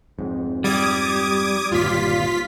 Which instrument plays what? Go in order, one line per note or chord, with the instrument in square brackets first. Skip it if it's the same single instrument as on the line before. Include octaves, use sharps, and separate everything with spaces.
[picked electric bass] F2 G#2
[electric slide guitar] G3 [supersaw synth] D6 D#6 G#6
[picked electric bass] G1 D#2 A#2 [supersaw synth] F4 B6